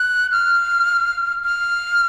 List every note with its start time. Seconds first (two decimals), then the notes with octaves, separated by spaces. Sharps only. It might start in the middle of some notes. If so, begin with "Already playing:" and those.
Already playing: F#6
0.32 F6
1.44 F6